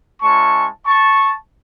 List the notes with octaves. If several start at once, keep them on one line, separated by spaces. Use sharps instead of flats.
G#3 C#4 E4 A5 C#6
A5 C#6